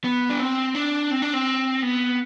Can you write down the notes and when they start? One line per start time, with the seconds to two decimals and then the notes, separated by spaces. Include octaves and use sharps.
0.04 B3
0.29 D4
0.40 C4
0.75 D4
1.11 C4
1.22 D4
1.33 C4
1.82 B3